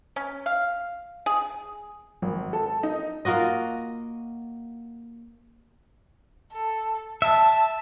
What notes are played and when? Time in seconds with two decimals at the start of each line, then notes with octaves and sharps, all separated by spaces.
0.16 C#4
0.46 F5
1.26 G#4
2.22 G#1
2.53 A4
2.83 D#4
3.25 A#3 F4 F#4 D#5
6.52 A4
7.22 E5 A5